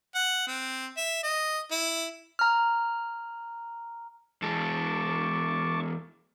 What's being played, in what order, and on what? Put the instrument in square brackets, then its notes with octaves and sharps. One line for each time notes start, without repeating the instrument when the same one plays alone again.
[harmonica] F#5
C4
E5
D#5
E4
[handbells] A#5 F6
[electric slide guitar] E2 G#3 [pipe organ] A5 C#6 D6